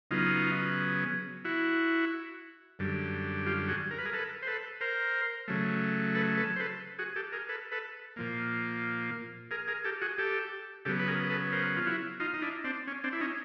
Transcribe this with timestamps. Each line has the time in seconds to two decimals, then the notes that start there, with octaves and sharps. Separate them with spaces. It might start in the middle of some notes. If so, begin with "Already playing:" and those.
0.11 C#3 F#3 B3 D#4 F4
1.45 E4 F#4
2.79 F#2 D3 G3
3.46 F4 G4
3.69 F#4 G#4
3.91 A#4
3.98 B4
4.05 G#4 A#4
4.13 A4 B4
4.42 C5
4.47 A4 B4
4.81 A#4 C5
5.48 C#3 F#3 A3
6.15 A4 B4
6.37 A4 B4
6.56 C5
6.60 A4 B4
6.99 F#4 G#4
7.16 G4 A4
7.32 G#4 A#4
7.49 A4 B4
7.72 A4 B4
8.16 A#2 F3 A#3
9.51 G#4 A#4
9.68 G#4 A#4
9.84 G4 A4
10.01 F#4 G#4
10.18 G4 A4
10.85 C#3 F#3 B3 G4 A4
11.00 B4
11.08 G#4 A#4
11.30 A4 B4
11.52 A#4 C5
11.76 F4
11.86 E4 F#4
12.20 D#4 F4
12.34 D#4
12.42 D4 E4
12.64 C4 D4
12.87 C#4
13.04 C4 D4
13.13 E4
13.21 C#4 D#4